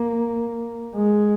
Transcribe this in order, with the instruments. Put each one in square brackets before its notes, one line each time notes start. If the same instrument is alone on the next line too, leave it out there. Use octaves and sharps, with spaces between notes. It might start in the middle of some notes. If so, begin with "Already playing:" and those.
Already playing: [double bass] A#3
G#3